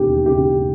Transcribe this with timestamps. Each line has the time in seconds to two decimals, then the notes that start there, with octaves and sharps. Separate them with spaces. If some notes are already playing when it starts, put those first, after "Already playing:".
Already playing: E1 D#2 C#3 G4
0.26 C#3 G4